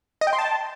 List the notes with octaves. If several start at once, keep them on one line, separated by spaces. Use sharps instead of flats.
D#5
G5
C6
A5